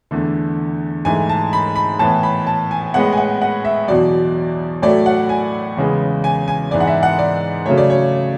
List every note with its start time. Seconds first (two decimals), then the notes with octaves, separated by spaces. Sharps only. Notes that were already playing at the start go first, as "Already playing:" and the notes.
0.11 E2 D3 A3
1.05 G#2 E3 A3 G#5
1.29 A5
1.53 B5
1.76 B5
1.99 A2 E3 B3 A5
2.23 B5
2.47 A5
2.71 G#5
2.94 A2 G#3 B3 F#5
3.13 G#5
3.17 F#5
3.42 F#5
3.65 E5
3.88 E2 B2 F#3 D5
4.82 A2 F#3 A3 D5
5.06 F#5
5.29 G#5
5.77 E2 C#3 G#3 B3
6.24 G#5
6.48 G#5
6.71 G#2 E3 B3 D5
6.80 F#5
6.87 E5
7.03 F#5
7.19 D5
7.66 C#3 F#3 A3 C#5
7.78 D5
7.90 C#5